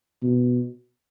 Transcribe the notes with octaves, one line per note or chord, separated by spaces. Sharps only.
B2